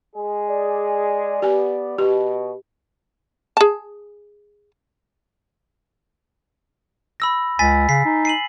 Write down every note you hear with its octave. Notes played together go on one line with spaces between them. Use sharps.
G#3 G#4
D5
B3 G4 G#5
B2 G4
G#4 A5
B5 E6 A#6
C#2 G#5 A6 B6
C#3 B6 C7
D#4
C7 D#7 F#7